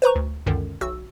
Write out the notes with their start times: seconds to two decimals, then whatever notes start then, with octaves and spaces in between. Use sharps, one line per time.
0.02 B4 C5 A#5 C#6
0.16 D2
0.46 C#2 F#2 D3 D#3
0.81 B1 F#4 E6